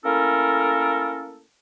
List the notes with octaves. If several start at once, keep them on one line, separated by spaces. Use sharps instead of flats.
A3 A#3 C#4 E4 A4 A#4